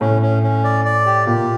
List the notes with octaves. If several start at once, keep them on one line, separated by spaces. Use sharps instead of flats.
A2 C#4
C#4
C#4
D5
D5
G4
A#2 G4